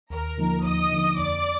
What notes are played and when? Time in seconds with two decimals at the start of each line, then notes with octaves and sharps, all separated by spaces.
0.10 D#2 A#4 A#5
0.38 D3 F3 A#3 D#4
0.65 D#2 D#5 D#6
0.92 D3 F3 A#3 D#4
1.19 F2 D5 D6